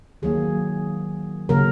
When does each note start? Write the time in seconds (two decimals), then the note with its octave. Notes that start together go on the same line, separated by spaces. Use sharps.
0.22 D#3 F#3 A#3 G#4
1.49 C#3 F#3 A#3 A#4